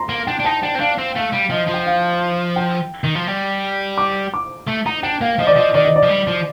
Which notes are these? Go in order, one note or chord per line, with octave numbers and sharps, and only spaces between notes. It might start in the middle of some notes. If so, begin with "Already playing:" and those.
Already playing: A#5 C6
A#3
D4 G5
D4
D#4 A5
D4 G5
C4
D4 F5
C4 F5
A3 F5
G3
F3 D#5
F3
G5
F5
G5
D#3
F3
G3
D6
D6
A3
D#4 A#5
D4 G5
A#3 F5
F3 D#5
D5
F3 D#5
D#3 D5
D#5
D5
F3
G3
F3